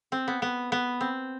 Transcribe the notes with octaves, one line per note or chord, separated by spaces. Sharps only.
C4
B3
B3
B3
C4